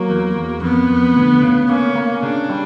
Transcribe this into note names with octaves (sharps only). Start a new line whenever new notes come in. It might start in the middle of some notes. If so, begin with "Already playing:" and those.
Already playing: F#3 A#3
E2
E2
F2 B3
F2
D2
C#3
A#3 C#4
A#3
C#3 D4
G3